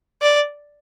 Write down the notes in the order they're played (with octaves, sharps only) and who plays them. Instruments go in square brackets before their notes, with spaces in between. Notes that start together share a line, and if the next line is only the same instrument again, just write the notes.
[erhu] D5